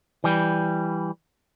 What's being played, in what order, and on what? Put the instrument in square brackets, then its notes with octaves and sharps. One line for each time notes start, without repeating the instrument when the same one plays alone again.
[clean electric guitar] E3 G3